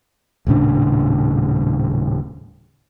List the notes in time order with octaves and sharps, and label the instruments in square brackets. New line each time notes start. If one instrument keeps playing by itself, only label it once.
[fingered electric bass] D#1 A2 C#3 D4